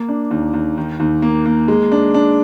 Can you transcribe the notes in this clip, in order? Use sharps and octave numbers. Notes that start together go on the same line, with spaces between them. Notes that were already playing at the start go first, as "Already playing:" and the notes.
Already playing: A#3
D4
D#2
D#2
D#3
D#2
A#3
A#3
G#3
D4
D4